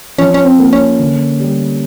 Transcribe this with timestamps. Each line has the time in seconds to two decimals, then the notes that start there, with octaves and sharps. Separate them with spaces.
0.18 F3 C#4
0.34 C#4
0.45 C4
0.59 A#3
0.73 C#4
0.99 D3
1.40 G3